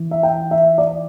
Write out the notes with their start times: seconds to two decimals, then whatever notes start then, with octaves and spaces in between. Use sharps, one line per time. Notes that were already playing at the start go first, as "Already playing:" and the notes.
Already playing: E3
0.11 E5
0.23 G5
0.51 E5
0.78 D5